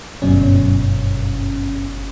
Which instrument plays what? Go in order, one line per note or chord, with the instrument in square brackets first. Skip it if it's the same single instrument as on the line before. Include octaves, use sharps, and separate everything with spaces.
[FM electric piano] G1 F#2 B2 C#4